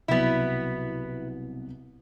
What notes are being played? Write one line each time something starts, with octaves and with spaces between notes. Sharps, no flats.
C2 B2 F#3 B3 E4